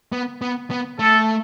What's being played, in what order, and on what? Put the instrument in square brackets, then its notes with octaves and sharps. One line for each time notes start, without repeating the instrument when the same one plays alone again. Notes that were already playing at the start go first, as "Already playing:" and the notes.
[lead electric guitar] B3
B3
B3
[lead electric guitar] A3 [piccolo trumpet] A4